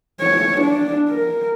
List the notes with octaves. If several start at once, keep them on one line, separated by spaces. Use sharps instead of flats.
C#5
D4
A#4